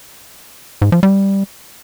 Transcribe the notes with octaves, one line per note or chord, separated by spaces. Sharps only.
G#2
F3
G3